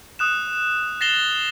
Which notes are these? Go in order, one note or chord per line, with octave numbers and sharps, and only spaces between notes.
D#6 F#6 E7
A6 A#6 C7 E7 F7 G7